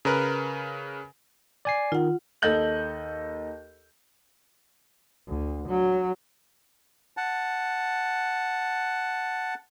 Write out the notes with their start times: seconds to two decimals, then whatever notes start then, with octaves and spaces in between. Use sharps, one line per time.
0.05 C#3 A#4 B4
1.65 D5 G#5 C7
1.92 D#3 F4 F#5
2.42 D#2 A4 D#5 G6 F#7
5.28 D2
5.68 F#3
7.17 F#5 A5